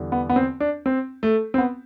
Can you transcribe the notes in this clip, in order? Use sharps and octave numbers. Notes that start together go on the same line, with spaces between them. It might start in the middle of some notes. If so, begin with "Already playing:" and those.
Already playing: E2 D3 G3
B3
B3
C4
D4
C4
A3
C4
B3